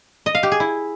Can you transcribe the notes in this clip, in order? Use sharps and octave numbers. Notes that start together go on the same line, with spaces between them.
D#5
F5
G4
G#4
E4